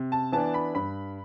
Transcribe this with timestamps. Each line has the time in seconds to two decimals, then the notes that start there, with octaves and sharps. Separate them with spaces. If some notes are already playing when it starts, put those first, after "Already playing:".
Already playing: C3
0.12 A5
0.32 E3 B3 D4 A5
0.54 B5
0.74 G2 B5